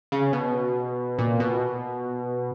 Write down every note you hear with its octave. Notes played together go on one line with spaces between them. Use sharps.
C#3
B2
A#2
B2